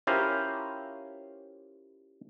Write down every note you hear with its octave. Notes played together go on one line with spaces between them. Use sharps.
C#4 E4 F4 G4 A#4 C5